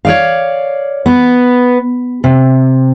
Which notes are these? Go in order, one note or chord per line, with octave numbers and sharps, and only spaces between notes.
C#5 D5 F5
B3
C3